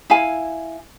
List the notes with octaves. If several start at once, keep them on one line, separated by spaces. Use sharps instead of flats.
E4 F5 G#5